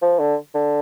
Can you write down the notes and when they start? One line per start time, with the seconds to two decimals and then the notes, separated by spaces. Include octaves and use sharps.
0.02 F3
0.20 D3
0.55 D3